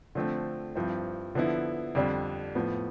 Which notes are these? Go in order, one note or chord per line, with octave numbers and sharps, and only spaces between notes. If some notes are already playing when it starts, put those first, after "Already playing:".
D3 F3 A3 C4
G2 F3 C4 E4
D3 F3 B3 E4
F2 D3 G3 D4
A2 F3 B3